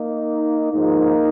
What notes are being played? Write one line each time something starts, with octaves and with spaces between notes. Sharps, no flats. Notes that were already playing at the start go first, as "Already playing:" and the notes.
Already playing: A#3 D#4
G#2 F3 G#3 A#3 D#4